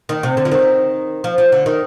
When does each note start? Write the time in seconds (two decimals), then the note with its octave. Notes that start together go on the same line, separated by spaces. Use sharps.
0.09 D#3
0.23 C3
0.37 D3
0.45 F3
0.52 D#3
1.24 F3
1.38 F3
1.52 D3
1.66 D#3